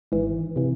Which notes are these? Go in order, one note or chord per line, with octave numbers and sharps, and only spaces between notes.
G#1 G#2 E3
C3 E3